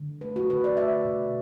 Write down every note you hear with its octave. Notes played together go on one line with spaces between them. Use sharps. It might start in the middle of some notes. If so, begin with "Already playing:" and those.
Already playing: D3
A3 B4
F#4
D3 B4
D5
A3 E5
B2